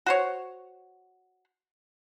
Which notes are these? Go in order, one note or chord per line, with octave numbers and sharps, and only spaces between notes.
F#4 C5 C#5